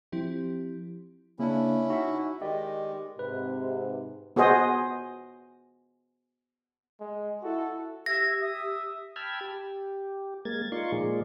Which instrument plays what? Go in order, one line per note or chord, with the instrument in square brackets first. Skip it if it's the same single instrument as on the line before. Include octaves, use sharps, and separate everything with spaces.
[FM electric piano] F3 C4 E4 G4
[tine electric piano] C#3 D4 [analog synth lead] A#3 [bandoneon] C#4 E4
[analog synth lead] D#4 [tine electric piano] F#4 E5
[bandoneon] D#3 G#3 [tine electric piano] G4 D5 [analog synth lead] D#5
[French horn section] G#2 C3 [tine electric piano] B4
[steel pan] B3 F#4 G#4 C5 D#5
[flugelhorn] G#3
[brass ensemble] E4 A4 [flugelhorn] F#4
[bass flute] G4 [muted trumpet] E5 [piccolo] G#6 [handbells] A#6
[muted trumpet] E5 [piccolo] D#6
[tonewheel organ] G5 A5 B5 E6 F6 G#6
G4
G#3 A#3 A#4 G#6 A6
D#4 F4 A#4 D5 C6 C#6
A#2 F3 G#3 G#4 A#4 D5